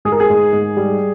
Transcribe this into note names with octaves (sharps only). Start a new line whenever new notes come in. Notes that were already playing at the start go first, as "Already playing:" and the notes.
G#2 G#4
A#4
G#4
G#2
G#2
G3